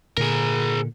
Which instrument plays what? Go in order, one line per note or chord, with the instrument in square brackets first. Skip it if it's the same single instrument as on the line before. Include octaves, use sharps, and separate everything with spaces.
[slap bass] A#2 D3 [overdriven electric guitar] G#4 A#4